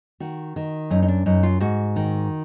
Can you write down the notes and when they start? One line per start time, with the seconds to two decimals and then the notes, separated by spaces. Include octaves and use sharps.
0.20 D#3 F#4
0.56 D#3
0.90 F#2 D#4
1.02 D#4
1.08 D4
1.26 F#2 D#4
1.43 F4
1.60 G#2 F#4
1.96 D#3